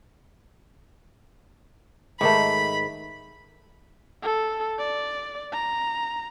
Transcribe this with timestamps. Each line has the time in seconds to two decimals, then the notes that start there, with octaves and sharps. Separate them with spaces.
2.21 G#2 D#3 A3 B5
4.23 A4
4.79 D5
5.52 A#5